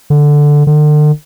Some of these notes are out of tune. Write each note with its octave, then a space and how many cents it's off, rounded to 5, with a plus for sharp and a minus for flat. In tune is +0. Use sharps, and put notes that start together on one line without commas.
D3 +0
D3 +40